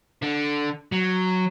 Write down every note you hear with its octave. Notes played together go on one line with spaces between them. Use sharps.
D3
F#3